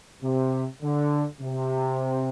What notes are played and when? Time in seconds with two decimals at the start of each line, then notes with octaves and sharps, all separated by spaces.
0.23 C3
0.82 D3
1.40 C3